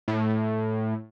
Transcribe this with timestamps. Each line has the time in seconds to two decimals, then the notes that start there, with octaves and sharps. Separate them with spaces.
0.08 A2